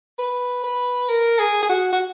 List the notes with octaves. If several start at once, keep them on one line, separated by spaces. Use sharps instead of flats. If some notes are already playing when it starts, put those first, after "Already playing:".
B4
B4
A#4
G#4
G#4
F#4
F#4